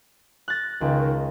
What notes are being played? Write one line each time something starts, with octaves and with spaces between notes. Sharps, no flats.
F#6 A6 A#6
C#2 D#3